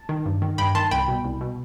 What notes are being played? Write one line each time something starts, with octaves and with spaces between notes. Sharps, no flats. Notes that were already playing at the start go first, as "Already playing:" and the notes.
Already playing: A5
D#3
G2
D#3
G2 G5 B5
D#3 A5 C6
C2 G5 B5
B2
C2
B2